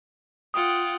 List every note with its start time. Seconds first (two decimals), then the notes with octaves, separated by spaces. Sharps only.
0.54 F4 F#5 G5 D#6